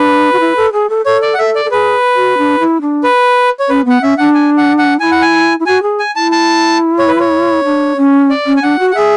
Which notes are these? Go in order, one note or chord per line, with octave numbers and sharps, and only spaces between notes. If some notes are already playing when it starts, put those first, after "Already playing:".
Already playing: D4 B4
F#4
E4
A4
G#4
A4
A4 C#5
D5
F#5
A4 E5
D5
A4
G#4 B4
F#4
D4
E4
D4
B4
C#5
C#4 B4
B3 F#5
C#4 E5
D4 F#5
G#5
F#5
F#5
E4 G#5
F#5
G#5
E4
F#4 G#5
G#4
G#5
E4 A5
A5
C#5
B4
C#5
D4
C#4
D5
C#4
G#5
D4 F#5
F#4
F#5
G#4 E5